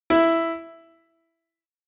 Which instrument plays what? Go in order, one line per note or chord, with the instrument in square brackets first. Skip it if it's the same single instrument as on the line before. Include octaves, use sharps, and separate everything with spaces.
[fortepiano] E4